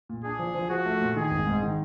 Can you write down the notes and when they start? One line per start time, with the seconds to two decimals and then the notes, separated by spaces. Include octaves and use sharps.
0.09 A#2
0.24 D4 G#4
0.39 F3
0.55 F3
0.70 F3 F#4
0.86 A3
1.01 A#2
1.16 D#3 G#4
1.31 G#1
1.47 G#2
1.62 D#3